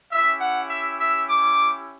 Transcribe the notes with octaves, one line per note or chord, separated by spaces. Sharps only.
C#4 E4 G4 E5
F#5
E5
E5
D6